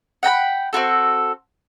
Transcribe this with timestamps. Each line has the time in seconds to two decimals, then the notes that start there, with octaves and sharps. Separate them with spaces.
0.23 F#5 G5 A#5 B5
0.73 C4 F4 F#4 A4